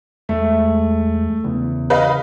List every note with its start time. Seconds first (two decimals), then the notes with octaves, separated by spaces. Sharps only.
0.29 E2 G#3 A3
1.44 E2 C#3
1.90 B4 D#5 F5